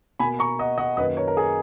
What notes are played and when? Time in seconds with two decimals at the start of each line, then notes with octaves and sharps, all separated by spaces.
0.19 B2 A#3 G#5 B5
0.39 A#5 C#6
0.59 D#5 F#5
0.78 D#5 F#5
0.97 F#2 D#3 A#3 B4 D#5
1.17 A#4 C#5
1.28 A#4
1.37 G#4